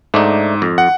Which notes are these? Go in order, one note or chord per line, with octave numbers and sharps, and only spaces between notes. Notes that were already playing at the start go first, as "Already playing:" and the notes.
G#2 A3 D4 D#4
F2
F#5